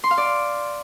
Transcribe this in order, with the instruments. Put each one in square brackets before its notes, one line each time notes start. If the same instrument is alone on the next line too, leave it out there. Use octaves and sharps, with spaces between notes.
[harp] C6
F5
D5